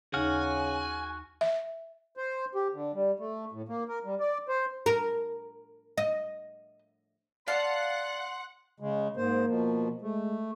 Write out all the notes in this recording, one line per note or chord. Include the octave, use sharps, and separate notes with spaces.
D#2 C#3 D#4 F#4 F#5 G#5 F6
E5
C5
G4
D3
G3
A3
A2
A#3
A#4
G3
D5
C5
A#4
D#5
D5 F5 F#5 A5 C6 C7
C#3 G#3
G#2 A#3 C5
B2 F3
G#3 A3